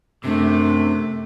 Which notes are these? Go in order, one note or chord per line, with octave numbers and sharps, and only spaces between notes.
F#2 C3 A3 D4